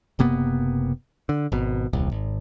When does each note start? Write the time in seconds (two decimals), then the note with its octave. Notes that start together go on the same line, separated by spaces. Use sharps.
0.19 F#1 C3 A#3 B3
1.29 D3
1.52 G#1 B2
1.93 D#1 C2
2.12 G#1